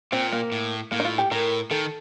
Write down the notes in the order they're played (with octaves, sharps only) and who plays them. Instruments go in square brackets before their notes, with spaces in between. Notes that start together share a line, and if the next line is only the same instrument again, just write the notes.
[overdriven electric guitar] A#2 [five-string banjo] C4
[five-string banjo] A#3
[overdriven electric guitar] A2
[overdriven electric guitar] A2 [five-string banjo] A#3
[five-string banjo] D#4
F4
G4
[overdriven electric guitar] A2 [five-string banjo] A#4
[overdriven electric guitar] D#3 [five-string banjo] A4